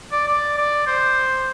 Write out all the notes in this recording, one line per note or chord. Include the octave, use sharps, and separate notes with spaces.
D5
D5
D5
C5